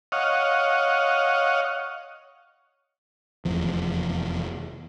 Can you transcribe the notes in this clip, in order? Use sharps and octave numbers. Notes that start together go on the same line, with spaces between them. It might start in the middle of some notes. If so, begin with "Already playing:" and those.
C#5 D#5 F5 F#5
F1 E2 F3